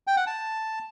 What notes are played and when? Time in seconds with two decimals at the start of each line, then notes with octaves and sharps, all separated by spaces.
0.07 G5
0.17 F#5
0.27 A5